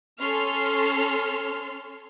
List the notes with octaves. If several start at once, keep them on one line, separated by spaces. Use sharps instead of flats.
C#4 A4 C6 F6